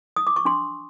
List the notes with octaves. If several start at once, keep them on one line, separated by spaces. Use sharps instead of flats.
D#6
D6
C#6
D4 C6